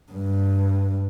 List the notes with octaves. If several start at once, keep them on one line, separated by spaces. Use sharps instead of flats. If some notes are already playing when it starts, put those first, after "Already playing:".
G2